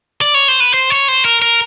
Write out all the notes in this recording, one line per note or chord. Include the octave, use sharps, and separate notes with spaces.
D5
C#5
C5
B4
C5
C#5
C5
A#4
A#4